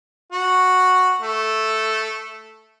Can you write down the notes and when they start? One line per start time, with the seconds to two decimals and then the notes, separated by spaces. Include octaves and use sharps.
0.32 F#4
1.21 A3